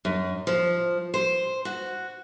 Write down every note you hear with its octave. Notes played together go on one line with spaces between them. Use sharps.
F#2
F3
C5
F#4